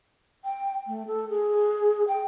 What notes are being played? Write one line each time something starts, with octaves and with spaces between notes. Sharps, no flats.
G5
A3
A4
G#4
G5